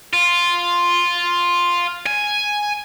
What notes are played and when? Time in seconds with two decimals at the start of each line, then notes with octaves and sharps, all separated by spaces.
0.14 F4
2.06 G#5